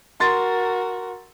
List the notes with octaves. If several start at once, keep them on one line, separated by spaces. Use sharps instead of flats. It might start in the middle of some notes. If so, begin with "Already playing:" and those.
F#4 A#4 C6 A6